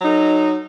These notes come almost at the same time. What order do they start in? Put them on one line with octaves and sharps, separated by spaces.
F#3 D#4 A4